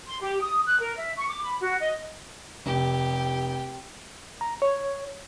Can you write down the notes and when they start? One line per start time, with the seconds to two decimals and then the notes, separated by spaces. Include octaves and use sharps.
0.07 C6
0.21 G4
0.42 D#6
0.66 F#6
0.79 A#4
0.98 E5
1.17 C#6
1.28 D6
1.43 B5
1.61 F#4
1.80 D#5
2.66 F1 G4
4.41 A#5
4.62 C#5